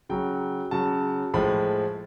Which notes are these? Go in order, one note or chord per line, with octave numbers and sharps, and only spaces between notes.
C#3 F#3 G5
C#3 F#3 A5
A2 F3 G#3 B5